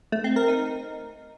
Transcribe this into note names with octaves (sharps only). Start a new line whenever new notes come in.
A3
C4
A#4
D#4